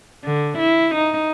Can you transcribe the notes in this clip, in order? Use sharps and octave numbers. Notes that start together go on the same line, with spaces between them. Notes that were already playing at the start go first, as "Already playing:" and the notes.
D3
E4
D#4